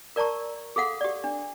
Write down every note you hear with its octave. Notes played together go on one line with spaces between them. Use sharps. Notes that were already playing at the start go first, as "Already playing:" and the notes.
A#4 D5 A5 A#5 C#6
G#4 A4 F5 F#5
G4 D5
D4